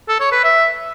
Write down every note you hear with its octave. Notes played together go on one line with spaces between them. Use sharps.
A4
C#5
B4
E5